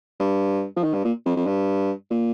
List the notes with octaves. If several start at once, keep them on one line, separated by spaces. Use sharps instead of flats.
G2
F3
D#3
G2
A#2
F2
F2
G2
A#2